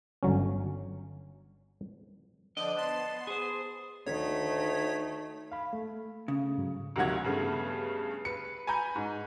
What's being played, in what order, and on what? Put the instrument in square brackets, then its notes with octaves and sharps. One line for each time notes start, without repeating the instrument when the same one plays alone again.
[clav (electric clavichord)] G1 D3 F#3 C#4
[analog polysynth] D3 D5 [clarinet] F3 [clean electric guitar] D#5
[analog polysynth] B3 C6 [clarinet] A5
[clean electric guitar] G#4 C5 [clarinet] D#6
[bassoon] D2 [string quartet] D#3 A3 [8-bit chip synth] C#5 G#6 B6
[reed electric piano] F5 B5
A3
[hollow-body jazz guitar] C#3
[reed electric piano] G#2 F#3
[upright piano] D2 C3 D#3 F#3 F#5 G#6
G2 C#3 A3 B3
B4 C#7
G#5 A#5 B5 G6
G#2